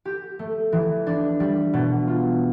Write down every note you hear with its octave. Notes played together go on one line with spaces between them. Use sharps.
G4
A3
E3
D4
G3
B2
F4